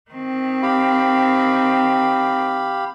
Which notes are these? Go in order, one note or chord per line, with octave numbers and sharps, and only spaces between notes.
D#3 C4
G4 F5 B5